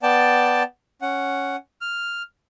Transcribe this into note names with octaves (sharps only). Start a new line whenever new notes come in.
B3 D5 G5 A5
C#4 F#5
F6